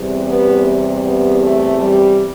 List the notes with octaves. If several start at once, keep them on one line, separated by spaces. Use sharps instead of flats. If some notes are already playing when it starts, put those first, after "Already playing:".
Already playing: E2 C3 G3
B3
B3
A3
G3